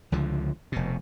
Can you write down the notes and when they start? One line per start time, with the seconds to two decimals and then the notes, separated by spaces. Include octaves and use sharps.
0.12 C#2 D3 F3
0.72 F1 B2